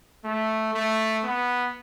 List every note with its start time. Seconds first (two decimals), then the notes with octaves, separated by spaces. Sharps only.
0.25 A3
0.74 A3
1.24 B3